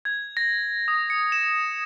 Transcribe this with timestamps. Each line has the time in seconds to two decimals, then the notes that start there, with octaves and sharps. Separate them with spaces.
0.05 G#6
0.37 A#6
0.88 D#6
1.10 C#7
1.32 E7